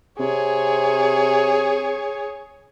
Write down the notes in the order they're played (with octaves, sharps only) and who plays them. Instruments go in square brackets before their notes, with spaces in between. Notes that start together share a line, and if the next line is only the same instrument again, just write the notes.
[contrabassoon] C3 [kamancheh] G#4 C#5